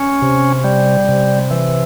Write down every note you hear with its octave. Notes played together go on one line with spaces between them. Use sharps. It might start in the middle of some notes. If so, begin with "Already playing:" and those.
Already playing: C#4
C3
G3
C3
E3